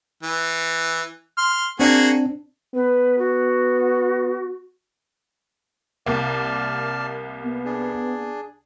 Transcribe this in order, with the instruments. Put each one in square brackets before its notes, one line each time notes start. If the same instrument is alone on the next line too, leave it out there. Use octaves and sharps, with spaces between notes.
[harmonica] E3
C6 F6
[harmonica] A#3 F#4 G#4 [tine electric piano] C4 D4
[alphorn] B3 [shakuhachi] B4
[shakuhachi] F#4
[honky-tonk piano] C2 A#3 [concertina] D5 A5 F6
[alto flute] B3
[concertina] D4 G#4